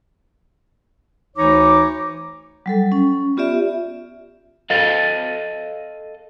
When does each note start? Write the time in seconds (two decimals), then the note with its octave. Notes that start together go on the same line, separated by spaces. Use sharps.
1.36 D2 E3 D#4 C#5 A#5 D6
2.66 F#3 G3 A4
2.92 C#4
3.37 B3 F4 G4 D5 E5
4.70 A4 D#5 F5